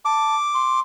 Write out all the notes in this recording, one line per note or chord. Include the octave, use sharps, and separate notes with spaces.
A5 D6
C6